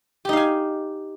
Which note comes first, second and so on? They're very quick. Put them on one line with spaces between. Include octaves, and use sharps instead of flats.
G4 D#4 F5 G#5